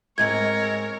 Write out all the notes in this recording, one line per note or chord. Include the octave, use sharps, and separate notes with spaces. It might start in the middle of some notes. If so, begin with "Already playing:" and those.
G#2 G#3 C4 A#4 C#5 G#6